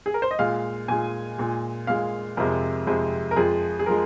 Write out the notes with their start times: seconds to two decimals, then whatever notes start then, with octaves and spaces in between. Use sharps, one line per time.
0.06 G#4
0.14 A#4
0.22 C5
0.31 D#5
0.39 A#2 G#3 F5
0.88 A#2 G#3 G#5
1.38 A#2 G#3
1.87 A#2 G#3 F5
2.37 F2 C3 G#3 A#4
2.87 F2 C3 G#3
3.31 A#4
3.36 F2 F3 G#3 G#4
3.79 G#4
3.86 F3 G#3 A#4